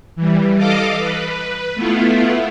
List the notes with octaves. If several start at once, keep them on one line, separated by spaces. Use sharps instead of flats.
E3 G3
A4 D#5 F5 D6
B4
A3 B3 E4 F4